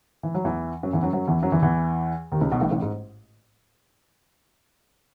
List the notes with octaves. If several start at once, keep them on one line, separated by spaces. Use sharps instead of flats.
E3
F#3
E2 E3
F#2 F#3
E2 E3
F#2 F#3
F#2 F#3
E2 E3
F#2 F#3
E2 E3
E2 E3
D#2 D#3
C#2 C#3
B1 B2
A1 A2
A1 A2
G#2